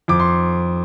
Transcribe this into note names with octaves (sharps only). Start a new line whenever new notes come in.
F2 D6
C6